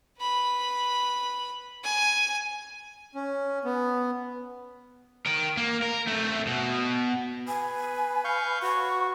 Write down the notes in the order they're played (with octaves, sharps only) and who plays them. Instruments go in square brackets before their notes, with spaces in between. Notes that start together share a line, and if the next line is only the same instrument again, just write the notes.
[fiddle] B4 B5
G#5
[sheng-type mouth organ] C#4
B3
[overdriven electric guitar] A#4 G5
A#3
A#4
A3 C4
B2
[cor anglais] B4 [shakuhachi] G#5
[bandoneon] F5 C#6 G6
[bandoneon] F#4 [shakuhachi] C#6